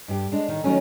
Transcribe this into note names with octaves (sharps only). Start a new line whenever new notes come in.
G2 G4
G#3 D4
A2 D#3
D#3 F#3 A3 C#4